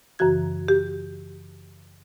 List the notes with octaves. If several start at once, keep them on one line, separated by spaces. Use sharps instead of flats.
F#2 C#3 E3 F#4 G#6
G4